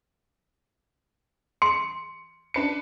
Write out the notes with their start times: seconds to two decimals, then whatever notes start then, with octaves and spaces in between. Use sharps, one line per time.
1.62 C6 C#7
2.54 D4 B4 C#7